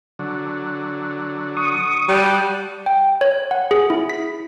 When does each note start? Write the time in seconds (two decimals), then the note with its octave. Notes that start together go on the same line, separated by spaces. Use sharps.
0.19 D3 F#3
1.57 C#6 D#6
2.09 G3 F#5 A5
2.86 G5
3.21 C#5
3.51 F#5
3.71 G#4
3.90 E4
4.09 B6